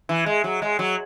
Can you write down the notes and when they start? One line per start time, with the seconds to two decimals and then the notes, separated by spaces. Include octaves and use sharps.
0.09 E3
0.26 G#3
0.44 F#3
0.62 G#3
0.79 F#3